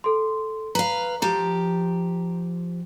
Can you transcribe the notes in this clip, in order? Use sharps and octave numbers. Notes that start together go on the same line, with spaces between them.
A4 C6
B4 F5 A#5
F3 G4 A#5